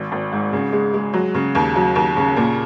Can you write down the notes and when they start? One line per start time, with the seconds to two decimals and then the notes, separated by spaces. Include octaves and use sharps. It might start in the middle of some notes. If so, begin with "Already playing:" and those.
Already playing: G#1
0.12 G#1
0.32 G#2
0.53 C#3
0.72 G#3
0.94 G#3
1.13 F#3
1.34 C#3
1.55 D#2
1.76 F#3
1.95 D#2
2.17 C#3
2.36 A#2